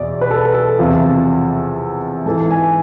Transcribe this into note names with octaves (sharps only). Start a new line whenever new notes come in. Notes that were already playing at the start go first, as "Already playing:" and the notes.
Already playing: E2 B2 D5
B4
A4
A4
E2 C3 F3
G#2 E3 A4
G#5